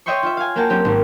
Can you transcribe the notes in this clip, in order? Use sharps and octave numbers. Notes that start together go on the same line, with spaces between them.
C#5 D#5 E5 G5 C6 C#6
F4 E5
F5 G#5
A#3 F#4 F5 G5 A5 A#5
F#3 C4 C#4 G4
G#1